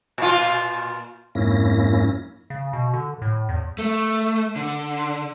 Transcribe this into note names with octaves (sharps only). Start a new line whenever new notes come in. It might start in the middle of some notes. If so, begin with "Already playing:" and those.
A#2 F4
F2 G#2 A#3 C#4 E4 A#6
C#3
B2
D3
A2
E2
A3
D3